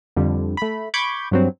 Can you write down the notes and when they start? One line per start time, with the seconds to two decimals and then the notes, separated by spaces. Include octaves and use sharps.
0.16 F2 D3 G3
0.57 A3 B5
0.94 B5 C#6 D6 G6 G#6
1.31 G2 F#3 C4